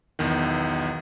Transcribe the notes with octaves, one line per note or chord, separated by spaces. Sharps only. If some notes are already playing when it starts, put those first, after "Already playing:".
B1 E2 D#3